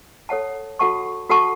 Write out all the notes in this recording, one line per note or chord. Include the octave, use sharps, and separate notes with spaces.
A4 C#5 F#5 A5
F#4 A4 F#5 A5 C#6
F#4 A4 F#5 A5 C#6